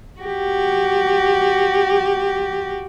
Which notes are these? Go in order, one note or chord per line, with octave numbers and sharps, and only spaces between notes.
F#4 G4